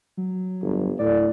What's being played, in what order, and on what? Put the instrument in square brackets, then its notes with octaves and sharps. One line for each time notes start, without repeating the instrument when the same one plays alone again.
[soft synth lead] F#3
[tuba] G1
[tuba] A2 [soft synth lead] D5